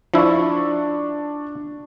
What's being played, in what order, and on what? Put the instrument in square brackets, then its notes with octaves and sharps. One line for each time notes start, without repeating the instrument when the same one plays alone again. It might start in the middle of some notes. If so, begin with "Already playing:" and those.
[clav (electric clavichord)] F3 E4 [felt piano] D4 C#6